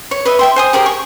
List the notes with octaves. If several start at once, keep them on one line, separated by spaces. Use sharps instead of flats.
C#5
B4 D#5 E5
E5 G5 C6
C5 G#5 D#6
G4 G#4 A#4 C5
C#6